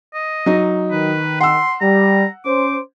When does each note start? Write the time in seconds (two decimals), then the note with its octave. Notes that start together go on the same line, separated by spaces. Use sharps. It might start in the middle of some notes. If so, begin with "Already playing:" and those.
0.14 D#5
0.46 F#3 D#4
0.91 D#3 B4
1.41 F#5 C6 E6
1.81 G3 A#5
2.45 C#4 C5 D6